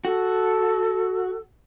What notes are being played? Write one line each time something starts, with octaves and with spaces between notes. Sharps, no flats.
F#4 A4